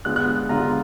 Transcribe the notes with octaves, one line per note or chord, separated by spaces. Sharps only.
D3 G#3 B3 F4 F#6
F#6
D3 G#3 B3 F4 A#5